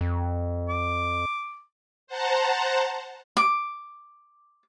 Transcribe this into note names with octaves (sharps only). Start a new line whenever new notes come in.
F2
D6
C5 F#5 A5 A#5
D6